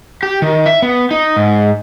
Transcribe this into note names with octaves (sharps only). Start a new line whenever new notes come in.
G4
D#3
E5
B3
D#4
G#2